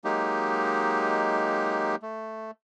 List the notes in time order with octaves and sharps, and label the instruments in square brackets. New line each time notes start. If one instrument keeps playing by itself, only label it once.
[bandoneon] F#3 G#3 A#3 D#4 G4
A3